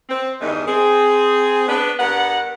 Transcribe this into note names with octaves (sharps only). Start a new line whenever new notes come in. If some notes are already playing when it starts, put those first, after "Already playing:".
C4
E2 G2 D#3 E3 B3 D#4
C4 G#4
B3 D4 B4
G2 B3 A#4 F#5